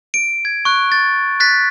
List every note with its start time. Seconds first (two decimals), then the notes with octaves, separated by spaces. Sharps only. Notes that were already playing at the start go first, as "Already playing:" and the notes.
0.14 D7
0.45 G#6
0.65 C#6 F#6
0.92 A6
1.40 F#6 A6 B6